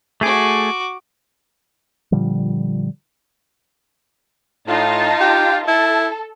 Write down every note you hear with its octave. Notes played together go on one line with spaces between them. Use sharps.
A3 F#4 G#4 D6
A#2 D3 F3 G3
A2 D#4 F4 A5
G4
E4 A4